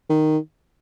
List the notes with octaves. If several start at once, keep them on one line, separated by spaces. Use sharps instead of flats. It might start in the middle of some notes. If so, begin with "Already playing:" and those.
D#3